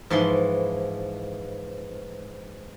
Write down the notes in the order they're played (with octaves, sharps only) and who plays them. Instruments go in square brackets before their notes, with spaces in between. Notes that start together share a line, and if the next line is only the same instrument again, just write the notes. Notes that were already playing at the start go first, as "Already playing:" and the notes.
[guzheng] G#2 E3 F3 B4 C6